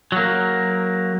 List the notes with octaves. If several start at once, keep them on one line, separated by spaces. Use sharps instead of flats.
F#3 A#3